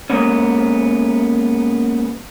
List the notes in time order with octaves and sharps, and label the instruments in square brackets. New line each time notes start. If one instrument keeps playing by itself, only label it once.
[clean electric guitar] G#3 A#3 B3 C#4